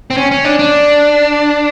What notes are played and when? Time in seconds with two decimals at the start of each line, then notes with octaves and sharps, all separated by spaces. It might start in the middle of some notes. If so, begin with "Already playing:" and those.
0.10 C4
0.17 C#4
0.31 C#4
0.44 D4
0.59 D4